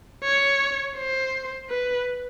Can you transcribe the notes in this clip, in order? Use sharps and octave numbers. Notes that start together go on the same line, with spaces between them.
C#5
C5
B4